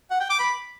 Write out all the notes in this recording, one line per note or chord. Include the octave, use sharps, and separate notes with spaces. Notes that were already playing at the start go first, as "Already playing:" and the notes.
F#5
G5
D6
B5